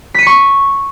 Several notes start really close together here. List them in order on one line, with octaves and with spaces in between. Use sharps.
B6 D#7 C#7 C#6